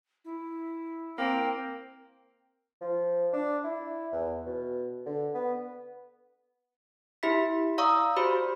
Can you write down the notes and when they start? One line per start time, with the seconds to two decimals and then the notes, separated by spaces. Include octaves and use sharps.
0.25 E4
1.18 A#3 C4 G5
2.81 F3
3.33 D4
3.64 E4
4.12 E2
4.46 B2
5.06 D3
5.34 B3
7.23 E4 G4 E5 B5 B6
7.78 D5 F5 A#5 C#6 D#6 E6
8.17 F#4 G4 C5 D5 B5